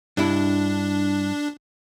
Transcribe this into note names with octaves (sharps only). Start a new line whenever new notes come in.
G2 D4 E4